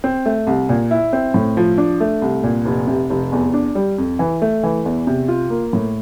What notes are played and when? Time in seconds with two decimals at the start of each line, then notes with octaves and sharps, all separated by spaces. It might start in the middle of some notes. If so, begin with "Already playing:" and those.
0.04 C4
0.26 A3
0.47 C2
0.69 A#2
0.91 E4
1.13 C4
1.34 A2
1.57 F3
1.78 D4
2.00 A3
2.22 C2
2.43 A#2
2.66 F1
2.87 C3
3.10 F1
3.32 E2
3.54 D4
3.75 G3
3.98 F2
4.19 E3
4.42 A3
4.63 E3
4.85 E2
5.07 C3
5.28 F4
5.50 A#3
5.73 A2